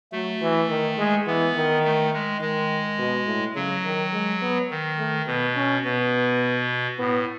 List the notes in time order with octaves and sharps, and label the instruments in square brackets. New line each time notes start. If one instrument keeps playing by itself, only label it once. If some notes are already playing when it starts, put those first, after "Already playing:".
[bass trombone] F#3 [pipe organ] A3
[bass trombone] E3
D#3
G#3
[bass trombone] E3 [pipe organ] B3
[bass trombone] D#3
[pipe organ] A3
G#3
[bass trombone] D#3 [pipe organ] G#3
[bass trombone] B2
A2
[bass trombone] C#3 [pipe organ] F#3
[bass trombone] D#3
G#3
B3
[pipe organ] D#3
[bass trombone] A3
[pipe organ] B2 [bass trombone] B3
[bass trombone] C#4
[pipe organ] B2 [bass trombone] B3
[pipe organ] A2 [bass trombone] B3